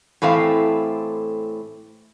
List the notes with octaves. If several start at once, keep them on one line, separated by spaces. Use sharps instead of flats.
A2 E3 A3 C4 F5